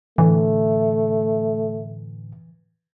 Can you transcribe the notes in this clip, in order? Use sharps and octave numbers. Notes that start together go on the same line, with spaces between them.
A2 D3 E3 A3